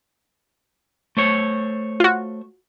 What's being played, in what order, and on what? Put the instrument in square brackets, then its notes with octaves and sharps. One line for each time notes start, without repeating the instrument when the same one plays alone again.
[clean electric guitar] A3 C5 C#5
[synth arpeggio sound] F4 F#4